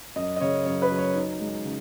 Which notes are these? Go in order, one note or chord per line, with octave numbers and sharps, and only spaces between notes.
F#2 D#5
D#5
C#3 C#5
F#2 C#5
B4
F#3
C#5
D#4
G#3
C#3